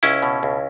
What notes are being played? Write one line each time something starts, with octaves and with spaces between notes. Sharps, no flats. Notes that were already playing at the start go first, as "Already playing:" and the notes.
C#2 C#4 E4
B2
C#2